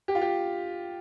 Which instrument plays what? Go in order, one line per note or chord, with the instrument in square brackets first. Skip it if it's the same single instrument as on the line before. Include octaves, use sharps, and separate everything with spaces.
[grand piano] G4
F4
G4